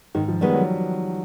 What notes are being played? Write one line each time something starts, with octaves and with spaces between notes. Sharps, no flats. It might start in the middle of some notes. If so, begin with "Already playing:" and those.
G#2 D#3
F3
D#3 G3 G#3 B3
F#3